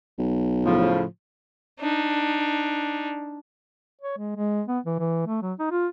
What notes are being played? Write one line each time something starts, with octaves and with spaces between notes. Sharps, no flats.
B1
A2 C#3 F3
D4 D#4
C#5
G#3
G#3
B3
E3
E3
A3
F#3
D#4
F4